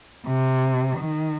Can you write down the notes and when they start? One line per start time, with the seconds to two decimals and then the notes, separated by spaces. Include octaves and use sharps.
0.27 C3
0.99 D#3